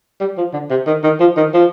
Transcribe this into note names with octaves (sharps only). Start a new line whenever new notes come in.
G3
F3
D3
C3
D#3
D#3
F3
D#3
F3